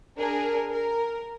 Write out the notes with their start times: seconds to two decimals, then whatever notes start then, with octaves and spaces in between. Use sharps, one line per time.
0.17 D4 G#4 A#4
0.71 A#4